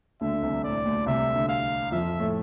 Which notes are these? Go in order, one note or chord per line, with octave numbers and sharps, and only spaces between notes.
D2 D3 E5
D3
C2 C3
A2 D5
D2 D3
C2 C3 E5
D2 D3
F5
F2 F3 E5
A2 A3